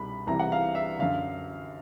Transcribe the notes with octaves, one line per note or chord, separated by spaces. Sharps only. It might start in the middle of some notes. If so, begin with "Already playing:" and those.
Already playing: C2 B2 B5
C2 C3 E3 A#5
F#5
F5
E5
F#2 D3 F5